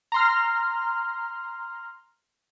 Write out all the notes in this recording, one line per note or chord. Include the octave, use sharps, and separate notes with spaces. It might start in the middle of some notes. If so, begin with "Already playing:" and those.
A#5 C6 F6